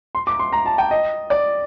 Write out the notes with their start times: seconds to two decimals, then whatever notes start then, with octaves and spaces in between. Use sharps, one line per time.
0.15 C6
0.27 D6
0.40 C6
0.53 A#5
0.66 A5
0.78 G5
0.91 D#5
1.30 D5